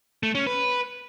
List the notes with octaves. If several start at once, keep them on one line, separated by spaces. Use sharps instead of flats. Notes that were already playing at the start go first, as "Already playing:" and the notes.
A3
C#4
B4